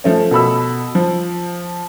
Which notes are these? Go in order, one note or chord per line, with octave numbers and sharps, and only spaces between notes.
F3 A3 C#4
B2 A4 B5 E6
F3